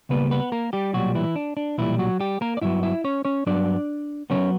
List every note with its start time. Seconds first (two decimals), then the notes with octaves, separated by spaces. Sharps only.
0.09 C#2 C#3 G3 A#3 B3 B4
0.31 B3 B4
0.52 A#3 A#4
0.73 G3 G4
0.93 B1 A#2 F#3 G3 F#4
1.15 E3 E4
1.36 D4
1.57 D4
1.78 B1 A#2 E3 G3 E4
1.99 F#3 F#4
2.20 G3 G4
2.41 A#3 A#4
2.57 D5
2.62 G2 F#3 B3 E4 E5
2.83 E4 E5
3.04 C#4 C#5
3.25 C#4 C#5
3.46 G2 F#3 B3 D4 D5
4.30 C#3 F#3 B3 C#4 C#5